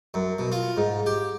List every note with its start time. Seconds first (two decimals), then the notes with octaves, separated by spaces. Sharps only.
0.14 F#2
0.39 B2
0.52 F4
0.77 G#2
1.06 G4